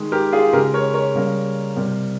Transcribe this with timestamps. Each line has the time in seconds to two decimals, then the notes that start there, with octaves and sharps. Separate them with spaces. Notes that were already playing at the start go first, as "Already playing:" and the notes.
Already playing: D#3 G#3
0.12 G4 A#4
0.32 F4 G#4
0.53 C#3 G#3 G4 A#4
0.74 A#4 C#5
0.94 A#4 C#5
1.15 C#3 G3 A#3
1.76 C3 G3 A#3